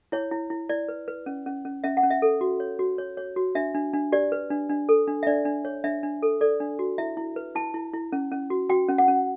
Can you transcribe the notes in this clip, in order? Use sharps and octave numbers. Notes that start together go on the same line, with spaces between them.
E4 C#5
E4
E4
E4 D5
B4
B4
C#4
C#4
C#4
C#4 E5
F#5
C#4
E5
A4
F#4
C#5
F#4
C#5
C#5
F#4
D4 E5
D4
D4
G4 D5
B4
D4
D4
A4
D4
E5
D4 D5
D4
C#5
D4 E5
D4
A4
A4 D5
D4
F#4
E4 E5
E4
B4
E4 A5
E4
E4
C#4
C#4
F#4
F#4 G5
C#4
F#5
C#4